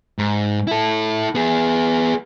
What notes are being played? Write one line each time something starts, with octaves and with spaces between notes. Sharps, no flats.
G#2
E4 A4
B3 G#4